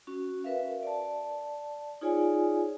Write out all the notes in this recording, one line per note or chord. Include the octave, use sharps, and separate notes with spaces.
C#4 F#4
A#4 B4 E5 F5
D5 A5
D#4 F4 G#4 C#5 D5 G#5